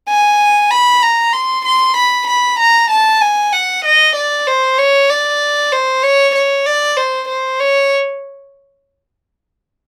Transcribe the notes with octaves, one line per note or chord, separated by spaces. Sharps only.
G#5
B5
A#5
C6
C6
B5
B5
A#5
A5
G#5
F#5
D#5
D5
C5
C#5
D5
C5
C#5
C#5
D5
C5
C5
C#5